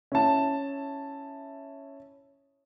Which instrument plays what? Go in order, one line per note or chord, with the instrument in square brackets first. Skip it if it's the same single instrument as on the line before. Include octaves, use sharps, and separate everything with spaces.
[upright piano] C#4 E4 A5